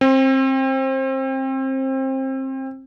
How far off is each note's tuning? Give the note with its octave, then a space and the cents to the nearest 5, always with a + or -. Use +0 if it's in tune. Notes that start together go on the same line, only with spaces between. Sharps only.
C4 +25